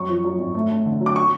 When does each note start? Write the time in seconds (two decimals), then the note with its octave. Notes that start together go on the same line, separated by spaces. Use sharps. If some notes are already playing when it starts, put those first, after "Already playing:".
Already playing: F#2 C#6
0.09 F3
0.24 F#2
0.39 G#1
0.55 A3
0.70 A3
0.85 D3
1.00 F#3
1.06 D6
1.16 C#6